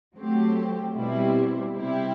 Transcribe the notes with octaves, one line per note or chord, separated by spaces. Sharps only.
F#3 A3 C4 G4
B2 G3 C4 E4
C3 G3 C4 E4 G4